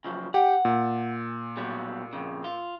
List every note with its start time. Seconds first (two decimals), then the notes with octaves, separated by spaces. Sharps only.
0.05 C#3 F3 F#3
0.34 G4 F#5 G5
0.65 A#2
1.57 B2 F#3 G3
2.13 F2 C#3
2.44 F4